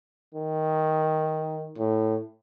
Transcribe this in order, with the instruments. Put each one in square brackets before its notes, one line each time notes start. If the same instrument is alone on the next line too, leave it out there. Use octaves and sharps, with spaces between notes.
[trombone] D#3
A2